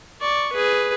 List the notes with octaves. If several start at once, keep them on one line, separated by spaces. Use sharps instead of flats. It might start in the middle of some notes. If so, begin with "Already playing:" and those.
D5 C#6
G#4 B4